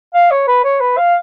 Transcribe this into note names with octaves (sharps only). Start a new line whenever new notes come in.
F5
C#5
B4
C#5
B4
F5